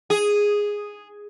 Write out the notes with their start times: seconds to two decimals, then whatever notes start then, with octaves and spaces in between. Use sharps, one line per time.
0.10 G#4